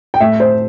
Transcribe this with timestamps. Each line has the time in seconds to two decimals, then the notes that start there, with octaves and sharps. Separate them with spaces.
0.14 G5
0.20 A2 A3 E5
0.40 C5